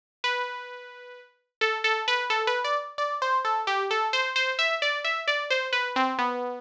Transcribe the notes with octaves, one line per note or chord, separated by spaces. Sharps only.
B4
A4
A4
B4
A4
B4
D5
D5
C5
A4
G4
A4
C5
C5
E5
D5
E5
D5
C5
B4
C4
B3